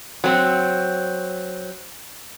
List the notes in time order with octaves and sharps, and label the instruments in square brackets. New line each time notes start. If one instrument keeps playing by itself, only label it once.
[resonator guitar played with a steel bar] F#3 C4